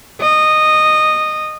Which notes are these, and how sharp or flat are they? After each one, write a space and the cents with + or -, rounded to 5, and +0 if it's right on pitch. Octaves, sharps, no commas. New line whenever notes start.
D#5 -15